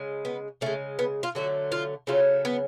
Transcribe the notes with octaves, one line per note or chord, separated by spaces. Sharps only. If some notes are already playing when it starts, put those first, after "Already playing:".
Already playing: C#3 G#3
B3
C#3 G#3 A3
B3
F4
D3 F#3 A3 F#4
F4
C#3 F#3 A3 F4
B3